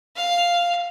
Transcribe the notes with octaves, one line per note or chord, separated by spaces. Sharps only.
F5